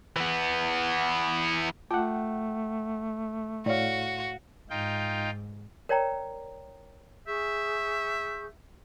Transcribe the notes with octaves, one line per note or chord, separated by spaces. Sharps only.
E3 B3
A3 F4 F#5 G5 A5
A2 F#4 C#5 D5 F5
G#2 D#4 F4 G5
A#4 C#5 D5 G5 A#5
G#4 E5 C#6 G6